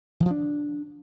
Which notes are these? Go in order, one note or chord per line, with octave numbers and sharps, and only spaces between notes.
E3
F3
D4